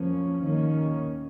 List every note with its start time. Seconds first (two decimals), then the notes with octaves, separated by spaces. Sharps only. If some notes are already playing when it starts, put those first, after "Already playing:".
Already playing: F2 F3 A#3 C#4
0.41 D#2 D#3 A#3 C#4